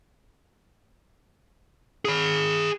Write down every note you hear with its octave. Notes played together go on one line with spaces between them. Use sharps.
G#4 B5